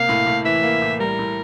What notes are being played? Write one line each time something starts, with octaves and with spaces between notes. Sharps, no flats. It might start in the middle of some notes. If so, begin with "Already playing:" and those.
Already playing: C3 A#3 F5
A2
A2
E3 E5
A#3
A2
G3 A#4
A2